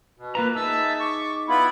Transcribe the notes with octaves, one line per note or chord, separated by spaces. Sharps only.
B2
A#3 F4 B4 A#5
D#4 G#4 E5 A5 E6
C#6 D6
B3 E4 F4 B5